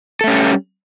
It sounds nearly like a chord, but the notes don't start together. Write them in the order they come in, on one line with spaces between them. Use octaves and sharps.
A4 A3 C#4 G3